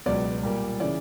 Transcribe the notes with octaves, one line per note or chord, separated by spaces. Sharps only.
C#2 B2 F#3 B3 D5
A#2 G3 A#3
C#3 E3 D5